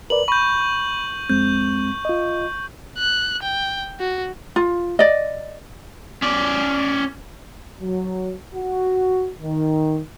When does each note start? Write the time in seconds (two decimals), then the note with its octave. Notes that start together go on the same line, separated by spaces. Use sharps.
0.10 A#4 B4 D5 F#7
0.28 B5 C#6 G6
1.30 F2 G#3 C4 G6
2.05 F4 D#5
2.98 F#6
3.43 G5
4.00 F#4
4.56 F4
4.99 D5 D#5
6.22 C#4 D5
7.81 F#3
8.54 F#4
9.40 D#3